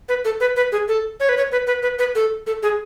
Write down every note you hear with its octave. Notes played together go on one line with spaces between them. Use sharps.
B4
A4
B4
B4
G#4
A4
C#5
B4
C#5
B4
B4
B4
B4
A4
A4
G#4